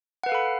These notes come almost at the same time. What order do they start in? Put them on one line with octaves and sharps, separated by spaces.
F#5 B4 F5 A4 B5